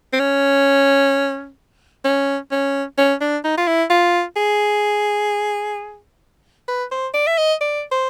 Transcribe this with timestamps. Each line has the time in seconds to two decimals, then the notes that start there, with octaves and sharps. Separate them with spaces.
0.13 C4
0.20 C#4
2.05 C#4
2.51 C#4
2.98 C#4
3.21 D4
3.44 D#4
3.58 F4
3.67 E4
3.90 F4
4.36 G#4
6.68 B4
6.91 C5
7.14 D5
7.27 E5
7.38 D#5
7.61 D5
7.92 C5